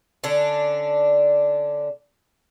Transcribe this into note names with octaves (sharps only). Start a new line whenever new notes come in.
D3 C#4 D4